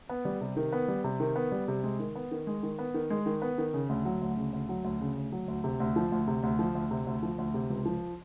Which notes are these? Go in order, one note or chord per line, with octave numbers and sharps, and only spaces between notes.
B3
G3
C3
D#3
B3
G3
C3
D#3
B3
G3
C3
G#3
D#3
B3
D#3
G#3
D#3
B3
D#3
G#3
D#3
B3
D#3
C#3
D2
F#3
D2
C#3
D2
F#3
D2
C#3
D2
F#3
D2
C3
D2
F3
D2
C3
D2
F3
D2
C3
D2
F3
D2
C3
C#2
F3